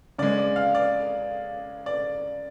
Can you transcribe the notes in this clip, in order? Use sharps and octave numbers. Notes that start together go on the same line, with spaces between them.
C#3 G#3 D5
D5
F5
D5
D5